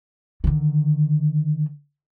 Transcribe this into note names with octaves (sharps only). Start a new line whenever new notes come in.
D3 D#3